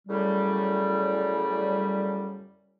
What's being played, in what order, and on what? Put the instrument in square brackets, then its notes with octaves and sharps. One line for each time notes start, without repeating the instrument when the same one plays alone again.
[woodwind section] F#2 A2 C#3 G3